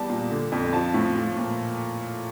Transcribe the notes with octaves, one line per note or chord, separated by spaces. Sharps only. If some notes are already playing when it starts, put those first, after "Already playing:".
Already playing: E2 G3 A5
A#2
D3
F2
F3 A5
A2
F3
A#2